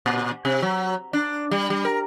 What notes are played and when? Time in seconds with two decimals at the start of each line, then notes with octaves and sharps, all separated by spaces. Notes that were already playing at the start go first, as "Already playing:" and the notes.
0.06 A#2
0.45 C3
0.62 F#3
1.13 D4
1.51 G3
1.70 G3
1.85 A#4